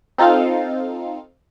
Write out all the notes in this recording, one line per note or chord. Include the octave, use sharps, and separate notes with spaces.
C4 D#4 F4 A4 F5